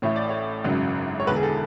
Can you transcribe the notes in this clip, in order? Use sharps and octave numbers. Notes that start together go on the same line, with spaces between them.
A1 A2 E3 A3 C#5
D5
C#5
G#1 F#2 C#3 F#3
C#5
E1 E2 D3 B4
G#4
A4